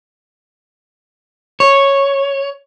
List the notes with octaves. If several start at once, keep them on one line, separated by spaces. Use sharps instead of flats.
C#5